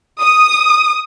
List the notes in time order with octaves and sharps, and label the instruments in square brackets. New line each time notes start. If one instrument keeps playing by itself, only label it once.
[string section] D#6